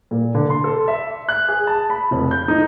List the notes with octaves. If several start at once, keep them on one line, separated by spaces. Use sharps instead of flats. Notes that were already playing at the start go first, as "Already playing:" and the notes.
A#2
D3
C6
A4
E5
F#6
G#4
A5
B5
F1
G6
D#4